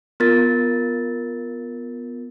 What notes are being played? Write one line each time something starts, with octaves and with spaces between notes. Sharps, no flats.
B3 F4 A#4 A6